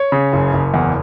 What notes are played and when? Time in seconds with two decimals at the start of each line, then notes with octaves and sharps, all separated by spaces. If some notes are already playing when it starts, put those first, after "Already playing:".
Already playing: C#5
0.12 C#3
0.33 F#1
0.53 F#1
0.74 E2